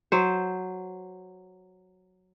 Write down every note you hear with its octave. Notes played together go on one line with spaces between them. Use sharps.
F#3 C5